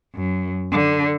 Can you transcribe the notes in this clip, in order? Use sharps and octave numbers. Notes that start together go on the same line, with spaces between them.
F#2
D3